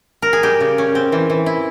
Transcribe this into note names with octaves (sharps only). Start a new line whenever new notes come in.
A#4
G#4
G3 G4
C#3
C#4
C4
E3
E3
E4